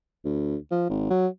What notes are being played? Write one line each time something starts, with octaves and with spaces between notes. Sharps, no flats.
D2
F3
G#1
F#3